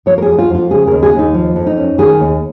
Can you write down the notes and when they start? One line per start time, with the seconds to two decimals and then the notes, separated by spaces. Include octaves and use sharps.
0.06 F3 C#5
0.18 A#4
0.22 G#4
0.28 F2
0.39 F4
0.50 F2 F4
0.70 C#3 G#4
0.87 D#2 A#4
1.03 G#4
1.14 D#2
1.19 D#4
1.34 F3
1.56 F2
1.66 D#4
1.77 C#4
1.98 D#3 G#4
2.20 D#2